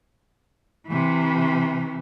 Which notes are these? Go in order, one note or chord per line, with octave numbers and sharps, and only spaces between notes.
C3 E3